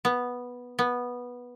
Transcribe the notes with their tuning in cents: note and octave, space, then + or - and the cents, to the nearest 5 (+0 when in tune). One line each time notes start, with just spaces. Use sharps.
B3 -5
B3 -10